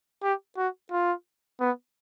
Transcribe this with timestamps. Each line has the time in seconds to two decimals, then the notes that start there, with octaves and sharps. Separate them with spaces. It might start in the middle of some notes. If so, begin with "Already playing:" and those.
0.23 G4
0.58 F#4
0.92 F4
1.60 B3